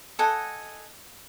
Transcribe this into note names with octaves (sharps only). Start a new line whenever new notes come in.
A4 D#5 F#5 G#5